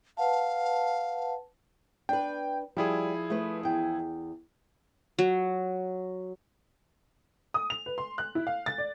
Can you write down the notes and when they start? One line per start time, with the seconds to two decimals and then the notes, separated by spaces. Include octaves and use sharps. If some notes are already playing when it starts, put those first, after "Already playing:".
0.17 B4 F5 F#5 A5
2.09 D4 B4 G5
2.77 F3 G3 E4 G#4
3.30 A3 B4
3.63 E2 G5
5.18 F#3
7.54 D#6
7.70 F7
7.86 B4
7.98 C6
8.18 F#6
8.35 E4
8.47 F5
8.66 A6
8.78 D5